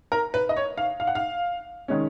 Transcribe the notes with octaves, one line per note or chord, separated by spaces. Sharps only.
A#4
B4
D#5
C#5
F5
F5
F#5
F5
D#3 G#3 C#4